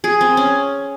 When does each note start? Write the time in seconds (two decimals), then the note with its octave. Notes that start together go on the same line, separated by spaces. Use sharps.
0.04 G#4
0.21 C4
0.37 C#4